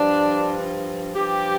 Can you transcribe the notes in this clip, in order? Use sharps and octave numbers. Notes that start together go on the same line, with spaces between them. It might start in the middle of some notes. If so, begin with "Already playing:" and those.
Already playing: G2 F3 D4
G2 F3 G4